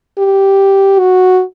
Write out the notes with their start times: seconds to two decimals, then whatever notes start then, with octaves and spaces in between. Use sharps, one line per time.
0.19 G4
0.99 F#4